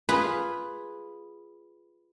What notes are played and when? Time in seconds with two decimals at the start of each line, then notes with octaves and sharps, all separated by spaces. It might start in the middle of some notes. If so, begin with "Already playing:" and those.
0.09 F4 G#4 B4 B5